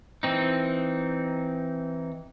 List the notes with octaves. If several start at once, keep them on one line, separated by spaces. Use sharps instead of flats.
E3 C4 D#4